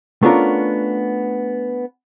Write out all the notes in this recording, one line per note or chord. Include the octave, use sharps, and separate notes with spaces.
A3 B3 C#4 D4 F4 A#4